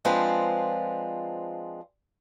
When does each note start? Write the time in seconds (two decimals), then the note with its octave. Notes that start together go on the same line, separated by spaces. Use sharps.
0.05 F3 G#3 C4 D4 F4 B4